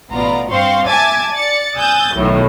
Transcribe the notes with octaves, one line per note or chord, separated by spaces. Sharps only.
A1 B2 B3 F4 D5 A#5
G2 C4 C5 F5 C6 C#6
E5 G#5 A5 D6 G#6 A6
D5 A6 C#7
G#5 D#6 E6 F#6 G6 A6
B1 A2 D#3 F#3